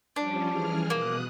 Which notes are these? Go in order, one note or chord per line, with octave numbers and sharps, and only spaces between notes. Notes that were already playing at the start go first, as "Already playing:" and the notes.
F3 G3 C#4 D4
E3 G#4 F6
B2 A#3 D#6 F#6